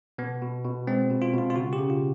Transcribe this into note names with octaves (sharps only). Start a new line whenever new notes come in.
B2 B3
B2
B2
G#3 C4
B2
F4
B2
F4
F4
C#3 F#4
G4
C#3
F4